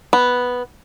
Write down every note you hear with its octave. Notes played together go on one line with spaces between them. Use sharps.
B3